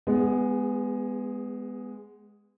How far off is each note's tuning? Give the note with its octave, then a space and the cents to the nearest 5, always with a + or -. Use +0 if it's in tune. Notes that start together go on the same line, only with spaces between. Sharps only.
G#3 +0 B3 +15 G#4 -35